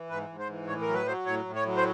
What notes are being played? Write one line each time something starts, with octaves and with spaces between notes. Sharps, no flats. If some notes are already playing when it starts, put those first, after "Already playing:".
Already playing: E3
G#2 B4
G#2
C5
E3
A2 C#5
A#4
F#3
B4
F#3 C5
A2 C#5
A2
C#5
F#3
C5